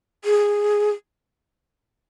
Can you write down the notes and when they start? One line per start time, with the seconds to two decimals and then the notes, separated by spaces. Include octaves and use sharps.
0.24 G#4